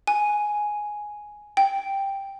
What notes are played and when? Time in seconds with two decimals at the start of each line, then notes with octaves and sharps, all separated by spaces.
0.07 G#5
1.57 G5